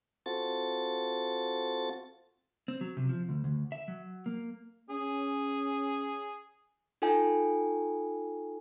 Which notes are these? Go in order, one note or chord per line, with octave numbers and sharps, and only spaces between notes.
C4 F4 F#4 A4 A6
C4
F#3
C3
F3
D2
D2
E5
F#3
A#3
C#4 G#4
D#4 F4 A4 G5 G#5